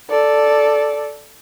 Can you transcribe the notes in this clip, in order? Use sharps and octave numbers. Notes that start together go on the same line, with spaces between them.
A4 D5